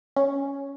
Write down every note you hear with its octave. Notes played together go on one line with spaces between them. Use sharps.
C#4